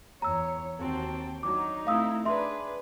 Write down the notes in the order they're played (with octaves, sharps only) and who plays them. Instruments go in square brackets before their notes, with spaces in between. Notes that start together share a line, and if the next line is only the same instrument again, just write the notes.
[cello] E2 C#5 [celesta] A#5 E6
[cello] D#2 G5 [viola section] C4 F#4 A5
[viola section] F#3 D4 [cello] D#4 [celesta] D6
[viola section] A3 C4 E4 [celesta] F5 D#6 E6
[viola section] D4 G#4 B4 [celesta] E5 C6